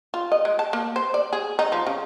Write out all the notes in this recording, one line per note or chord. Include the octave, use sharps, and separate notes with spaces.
F4
D#5
G#3
A5
A#3
C5
D5
G#4
D#4
F3
C#3